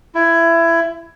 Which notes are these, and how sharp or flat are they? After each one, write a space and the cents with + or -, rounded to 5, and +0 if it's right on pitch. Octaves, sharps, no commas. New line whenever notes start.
E4 +20